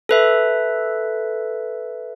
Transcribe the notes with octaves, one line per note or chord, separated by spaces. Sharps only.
A4 B4 E5